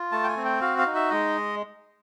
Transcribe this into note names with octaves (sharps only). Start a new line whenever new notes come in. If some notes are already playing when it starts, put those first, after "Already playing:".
Already playing: F4
A3 A5
G5
G#5
C4
G5
F#4 F5
F5
D#4
E5
G#3 D#5